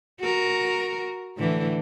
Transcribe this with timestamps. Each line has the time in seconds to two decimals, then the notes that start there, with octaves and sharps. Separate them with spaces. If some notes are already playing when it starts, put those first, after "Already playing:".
0.20 F#4 A#4
1.37 A2 D3 E3